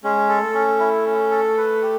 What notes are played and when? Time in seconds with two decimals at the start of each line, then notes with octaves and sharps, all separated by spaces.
0.04 G#3 C#4
0.29 A4
0.42 A3
0.55 C#4
0.80 E4
1.06 C#4
1.31 A4
1.57 B4
1.82 G4